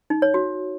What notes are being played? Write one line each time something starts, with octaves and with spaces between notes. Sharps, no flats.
D#4
C#5
F#4